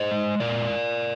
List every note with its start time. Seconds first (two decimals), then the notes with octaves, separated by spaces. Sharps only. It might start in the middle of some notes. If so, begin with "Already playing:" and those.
Already playing: C5 D#5
0.11 G#3
0.40 A#2 A#4 D5